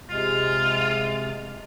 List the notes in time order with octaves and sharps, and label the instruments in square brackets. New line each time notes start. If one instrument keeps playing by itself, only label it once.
[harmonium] C3 G#3 [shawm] F4